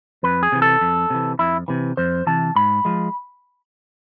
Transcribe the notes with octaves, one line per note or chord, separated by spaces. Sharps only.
F2 B4
G#4
C3 E3
A4
F2
C3 E3
F2 E4
C3 E3
F2 C5
C3 E3 A5
G#2 B5
F3 G#3